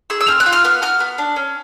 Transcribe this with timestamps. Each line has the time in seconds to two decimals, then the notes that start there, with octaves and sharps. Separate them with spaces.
0.10 G#4 E6
0.20 E6
0.28 C4 F6
0.40 F#6
0.46 F4
0.53 F6
0.64 B3 F6
0.82 F#4 F6
1.00 B3
1.18 D4
1.36 C#4